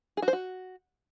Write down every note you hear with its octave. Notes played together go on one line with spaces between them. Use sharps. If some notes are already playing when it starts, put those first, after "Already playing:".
G#4
F#4
C5
F#4